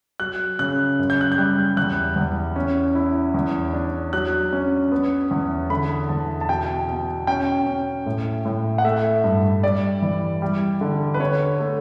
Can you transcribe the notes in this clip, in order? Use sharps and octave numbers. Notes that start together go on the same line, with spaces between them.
F#3 F#6
C#3 F#6
F#2
G6
F#6
G6
G3
E2 F#6
E2
C#4
E4
E2
D4
F#3 F#6
C#4
B3
E2
D3 B5
E2 A5
A5
B2 G5
B2
C#4 G5
C#4
A2
A2
F#5
A3 E5
G2
G3 D5
E3
G3
D3
B4
D3 C#5
A3